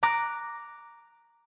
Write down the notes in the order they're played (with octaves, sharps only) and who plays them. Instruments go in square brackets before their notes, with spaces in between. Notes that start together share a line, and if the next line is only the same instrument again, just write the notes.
[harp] A#5 D6 F#6 A#6